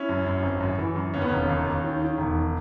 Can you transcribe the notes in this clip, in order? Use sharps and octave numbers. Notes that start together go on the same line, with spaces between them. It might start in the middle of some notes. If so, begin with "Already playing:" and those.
Already playing: C#4 E4
F#2
F#2
G#1
F#2
E3
F#2
D#2 C#4
B3
E1 C#4
D#2
D#2
D#3
D#3
E1